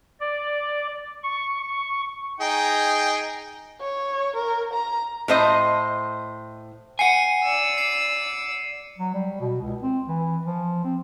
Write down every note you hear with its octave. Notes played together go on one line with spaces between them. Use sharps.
D5
C#6
C#6
D#4 G#4 G5
C#5
A#4
A#5
A2 C5 D#5
F#5 G#5 C7 C#7 D#7
D5 E6
C7
F#3
G3
B2
C#2
C4
E3
F3
C4